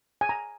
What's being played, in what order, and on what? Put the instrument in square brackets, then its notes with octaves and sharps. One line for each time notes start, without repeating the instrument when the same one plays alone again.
[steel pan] G#5
A#5